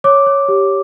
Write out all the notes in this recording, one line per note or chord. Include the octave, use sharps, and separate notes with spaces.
C#5 D6
C#5
G4